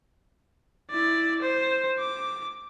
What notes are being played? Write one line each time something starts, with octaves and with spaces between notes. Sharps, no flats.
E4 D5
C5
D6